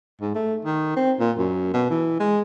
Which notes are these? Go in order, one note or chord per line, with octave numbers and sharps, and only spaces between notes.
G#2
A3
D#3
C4
A#2
F#2
B2
E3
G#3